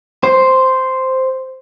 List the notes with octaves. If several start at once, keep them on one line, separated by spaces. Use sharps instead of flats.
C5